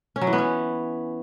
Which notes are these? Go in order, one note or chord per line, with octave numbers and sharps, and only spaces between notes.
C#4
F#3
E3
B3
C#4